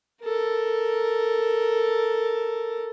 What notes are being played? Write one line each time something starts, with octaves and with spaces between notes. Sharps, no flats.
A4 A#4